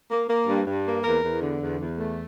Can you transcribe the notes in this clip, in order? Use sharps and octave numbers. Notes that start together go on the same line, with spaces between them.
A#3
A#3
G2
G2
A#3
E2 A#4
E2
D3
E2
E2
A3